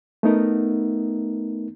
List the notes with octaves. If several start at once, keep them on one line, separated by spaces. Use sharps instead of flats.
A3 B3 D#4 A#4